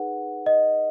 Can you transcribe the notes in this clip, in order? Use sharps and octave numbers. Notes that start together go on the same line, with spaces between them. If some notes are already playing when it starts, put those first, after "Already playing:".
Already playing: D#4 G#4 B4 F#5
D#5